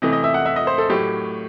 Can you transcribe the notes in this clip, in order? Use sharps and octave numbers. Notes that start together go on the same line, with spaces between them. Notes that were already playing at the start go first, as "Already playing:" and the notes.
C3 E3 A3 D#5
D#5
E5
F#5
E5
D#5
C5
A4
A2 F#3 A3 G4